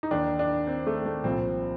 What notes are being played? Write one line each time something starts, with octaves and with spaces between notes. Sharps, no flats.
D#4
D#2 D#3 D4
D4
C4
A3
A3
C2 A#2 F3 C4